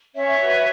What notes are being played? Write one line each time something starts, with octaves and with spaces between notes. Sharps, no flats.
C#4 C#5 E5
F#4 B4